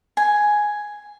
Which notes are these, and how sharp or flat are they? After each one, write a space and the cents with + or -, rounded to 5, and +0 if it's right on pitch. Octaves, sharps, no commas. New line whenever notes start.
G#5 +5